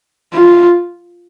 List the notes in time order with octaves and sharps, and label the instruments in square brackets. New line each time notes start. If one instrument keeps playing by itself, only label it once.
[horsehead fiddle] F4